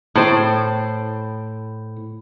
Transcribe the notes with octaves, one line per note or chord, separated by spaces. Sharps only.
A2 C5